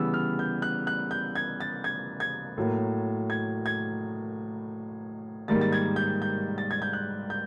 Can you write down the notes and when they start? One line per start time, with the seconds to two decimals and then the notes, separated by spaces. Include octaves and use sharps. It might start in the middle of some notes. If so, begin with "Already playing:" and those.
Already playing: C#3 E3 G3 B3 E6
0.14 F6
0.39 G6
0.62 F#6
0.87 F#6
1.11 G6
1.35 G#6
1.60 A6
1.84 G#6
2.20 G#6
2.58 A2 F#3 A#3
3.30 G#6
3.66 G#6
5.48 G#2 D#3 G3 A#3 A6
5.61 A6
5.72 G#6
5.96 G6
6.22 G6
6.58 A6
6.71 G#6
6.82 G6
6.93 F#6
7.30 G6